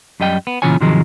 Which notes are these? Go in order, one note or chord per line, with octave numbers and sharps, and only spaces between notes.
F#2 G3 D#5 G5
B3
A#2 C#3 E3 F4 C#5 G#5
G#2 C3 D#3 F3 F#3 G#3